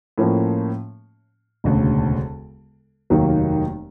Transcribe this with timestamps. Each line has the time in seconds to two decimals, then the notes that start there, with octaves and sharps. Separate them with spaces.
0.18 A2 F3 A#3 C#4
1.64 E1 D2 C#3
3.10 F1 D#2 D#3 F#3 A#3